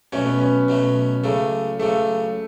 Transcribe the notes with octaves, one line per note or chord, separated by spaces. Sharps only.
B2 F#3 A3 C#4
B3
C#4
B2 F#3 A3
C#2 C#3 F#3 A3
C#2 C#3 F#3 A3